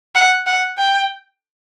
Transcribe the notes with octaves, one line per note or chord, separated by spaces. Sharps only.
F#5
F#5
G5